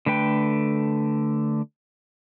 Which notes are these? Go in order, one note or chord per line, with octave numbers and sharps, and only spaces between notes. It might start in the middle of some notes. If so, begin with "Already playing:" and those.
D3 A3 B4 G5